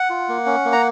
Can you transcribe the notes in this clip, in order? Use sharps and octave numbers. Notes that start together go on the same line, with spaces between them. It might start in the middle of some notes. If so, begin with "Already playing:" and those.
Already playing: F#5
F4
A#3
C#4
A#3
A#5